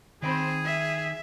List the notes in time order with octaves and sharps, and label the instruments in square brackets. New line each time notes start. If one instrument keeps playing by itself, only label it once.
[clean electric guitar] D#3 G5 B5 [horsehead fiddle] C4 C5 [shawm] G#4
[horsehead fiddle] E5